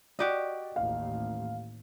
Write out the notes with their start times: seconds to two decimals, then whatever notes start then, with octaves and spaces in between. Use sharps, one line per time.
0.19 F#4 G4 D5 D#5
0.76 A1 D#2 F5